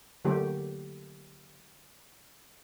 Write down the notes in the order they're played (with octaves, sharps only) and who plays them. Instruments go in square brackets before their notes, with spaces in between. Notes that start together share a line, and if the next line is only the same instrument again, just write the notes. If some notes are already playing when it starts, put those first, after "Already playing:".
[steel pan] D3 F#3 A3 A#3 G4